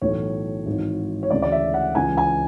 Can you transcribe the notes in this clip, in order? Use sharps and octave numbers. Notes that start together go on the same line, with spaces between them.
B1 A2 E3 C#5
G#1 G#2 E3
C#5
D2 C#3 E3 D5
D5
E5
F#5
C#2 C#3 E3 G#5
G#5